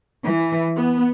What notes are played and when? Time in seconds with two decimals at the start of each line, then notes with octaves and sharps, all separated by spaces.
0.24 E3
0.77 B3